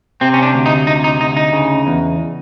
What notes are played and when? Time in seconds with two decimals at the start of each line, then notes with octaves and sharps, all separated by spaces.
0.21 C3 C4
0.34 C#4
0.43 D4
0.54 D2
0.66 D#4
0.87 C3 D#4
1.04 D#4
1.20 D2 D#4
1.37 D#4
1.53 C#3
1.87 E2